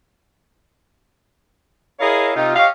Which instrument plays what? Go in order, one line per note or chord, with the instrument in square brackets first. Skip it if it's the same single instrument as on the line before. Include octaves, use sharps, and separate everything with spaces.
[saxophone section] E4 G#4 A#4 C#5 D#5 F5
C3 D#4 F4
G4 C#5 D#5 F5